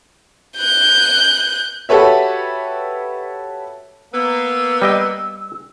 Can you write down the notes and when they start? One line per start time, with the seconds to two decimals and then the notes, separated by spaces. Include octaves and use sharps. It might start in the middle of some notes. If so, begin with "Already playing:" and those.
0.58 F#6 G6
1.89 F#4 G4 A4 B4 C#5 E5
4.13 A#3 B3 E6
4.82 G3 D#5 G5